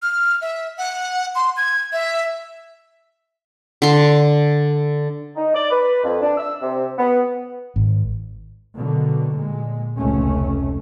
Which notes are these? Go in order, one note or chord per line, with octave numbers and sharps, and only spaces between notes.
F6
E5
F#5
C6
G#6
E5
D3 C6
D#4
D5
B4
F2
D4
E6
C3
B3
G#1
B2 D3 D#3 F#3
A#2 G#3
F1 C#2 A3 C#4